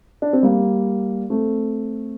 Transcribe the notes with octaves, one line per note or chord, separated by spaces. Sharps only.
D4
C4
G3 A#3
A3 C4